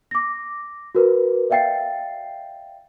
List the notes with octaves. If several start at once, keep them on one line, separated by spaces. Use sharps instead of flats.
D6 A#6
F#4 A#4 B4
D5 E5 F5 G5 A6 C7